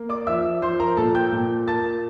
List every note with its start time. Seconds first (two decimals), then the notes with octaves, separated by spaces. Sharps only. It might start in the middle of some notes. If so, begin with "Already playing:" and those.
Already playing: A#3
0.09 D5 D6
0.27 F3 E5 E6
0.62 F3 C5 C6
0.80 A#4 A#5
0.97 A#2 A4 A5
1.15 G5 G6
1.32 A#2
1.68 A#3 A5 A6